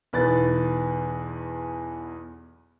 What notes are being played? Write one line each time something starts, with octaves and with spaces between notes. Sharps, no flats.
B1 E2 B4 A6